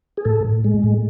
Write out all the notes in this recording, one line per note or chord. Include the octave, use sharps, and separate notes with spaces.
G#4
A2 A4
A2
G#3
A2